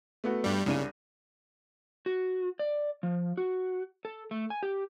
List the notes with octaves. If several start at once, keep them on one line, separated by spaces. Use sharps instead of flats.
A3 B3 F#4
G2 G3
C2 C#3 D4 D#7
F#4
D5
F3
F#4
A4
A3
G#5
G4